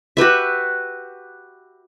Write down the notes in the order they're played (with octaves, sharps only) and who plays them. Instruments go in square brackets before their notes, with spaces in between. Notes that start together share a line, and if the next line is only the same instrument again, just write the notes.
[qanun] F#4 G4 B4 E5